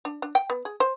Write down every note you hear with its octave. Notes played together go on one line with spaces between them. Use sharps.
D4
D4
G5
B3
G#4
C5